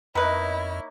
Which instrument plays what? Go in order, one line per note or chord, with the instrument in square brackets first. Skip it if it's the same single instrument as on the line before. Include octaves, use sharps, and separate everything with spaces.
[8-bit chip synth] F2 D#5 [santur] A#3 D#4 C#5 [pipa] B3 B4 [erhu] E4